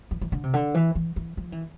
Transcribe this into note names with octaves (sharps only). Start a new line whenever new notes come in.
E3
E3
D3
C3
D3
E3
E3
E3
F3
E3